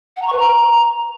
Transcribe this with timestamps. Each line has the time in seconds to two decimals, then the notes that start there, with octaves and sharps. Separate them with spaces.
0.17 F#5
0.22 A#5
0.27 C#6
0.32 B4
0.38 A#5